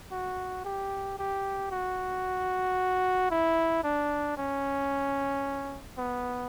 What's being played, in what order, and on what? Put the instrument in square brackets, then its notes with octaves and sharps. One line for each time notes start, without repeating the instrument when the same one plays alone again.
[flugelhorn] F#4
G4
G4
F#4
E4
D4
C#4
B3